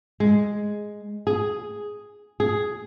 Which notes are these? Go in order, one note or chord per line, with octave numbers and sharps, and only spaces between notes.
G#3
G#4
G#4